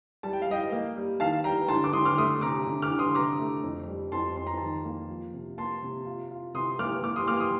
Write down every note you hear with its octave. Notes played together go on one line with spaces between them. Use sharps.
G3 A5
G5
F5
G3 D#5 G5
A#3
G3
D#3 F5 A5
G3 G5 A#5
D3 A5 C6
D6
D3 C6 D#6
D6 F6
A3 C6 D#6
C3 A#5 D6
D3
D6 F6
D3
C6 D#6
C6
C3 A#5 D6
A3
F2
G3
F2 A5 C6
F2 C6
A#5
D#3 A5 C6
A#3
F3
C3
A#3 A5 C6
C3
F4
F4
C3 C6 D#6
A#3 D6 F6
A#3 D6 F6
C6 D#6
A#3 D6 F6
C6 D#6